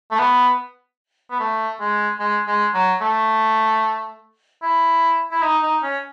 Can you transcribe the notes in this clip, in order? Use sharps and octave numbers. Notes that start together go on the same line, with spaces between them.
A3
B3
B3
A3
G#3
G#3
G#3
F#3
A3
E4
E4
D#4
D#4
C#4